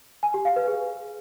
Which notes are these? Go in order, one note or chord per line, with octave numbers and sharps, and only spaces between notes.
G#5
G4
F5
B4
G#4